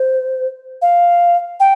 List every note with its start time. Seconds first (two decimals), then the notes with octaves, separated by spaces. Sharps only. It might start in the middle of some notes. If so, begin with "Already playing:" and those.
Already playing: C5
0.82 F5
1.60 G5